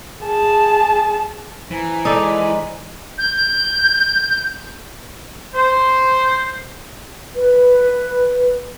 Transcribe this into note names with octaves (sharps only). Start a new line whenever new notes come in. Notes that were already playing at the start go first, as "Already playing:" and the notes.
G#4 A5
E3 C5 G#5 A#5
G#3 D#4 A4 D5
G6
C5
B4